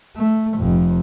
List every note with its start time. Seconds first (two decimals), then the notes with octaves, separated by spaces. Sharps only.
0.16 A3
0.57 F1 F2